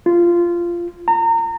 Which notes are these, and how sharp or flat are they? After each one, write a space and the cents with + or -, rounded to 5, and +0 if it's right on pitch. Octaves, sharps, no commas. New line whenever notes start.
F4 -15
A#5 -30